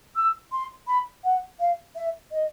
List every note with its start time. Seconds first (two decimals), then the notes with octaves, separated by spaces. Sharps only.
0.16 E6
0.52 C6
0.87 B5
1.24 F#5
1.59 F5
1.95 E5
2.32 D#5